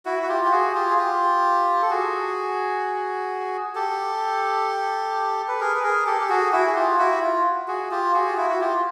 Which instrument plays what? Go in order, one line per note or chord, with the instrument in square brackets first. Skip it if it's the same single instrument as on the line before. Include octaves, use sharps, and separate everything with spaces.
[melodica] E4 F#4
F#4
F4 G4
G4
F#4 G#4
F4 G4
G#4
F4 G4
A4
F#4 G#4
G4 A4
B4
G#4 A#4
B4
G#4 A#4
G4 A4
G4
F#4 G#4
E4 F#4
G#4
F4 G4
E4 F#4
F4
F#4 G#4
F4 G4
F#4 G#4
F4
E4 F#4
F#4
F4 G4